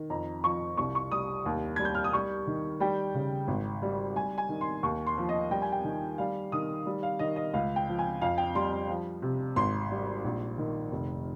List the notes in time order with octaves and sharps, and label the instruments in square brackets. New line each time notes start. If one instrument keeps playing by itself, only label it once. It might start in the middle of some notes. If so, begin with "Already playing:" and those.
Already playing: [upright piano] D#3
F2 A#5
F3 C#6
C2 C#6
C#6
G3 D#6
D#2
G3 G#6
G6
F6
D#6
G3 C#6
D#3
G3 G5
C#3
G#1
G3
G3 G#5
G#5
D#3
C6
D#2 C#6
C6
F3
D#5
G3 G5
G#5
G5
D#3
G3 F5
D#3 D#6
G3
F5
D#3 D#5
D#5
C#2 F5
G5
F3
G#5
F2 F5
G5
G3 C6
F3
C3
G#1 C6
G3
A#1
D#3
F1